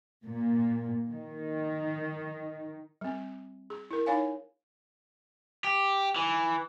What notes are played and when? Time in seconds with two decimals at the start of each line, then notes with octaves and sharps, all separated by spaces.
0.25 A#2
1.11 D#3
3.01 G3 C4
3.70 G#4
3.91 E4 A#4
4.06 D#4 C#5 F5 G#5
5.65 G4
6.16 E3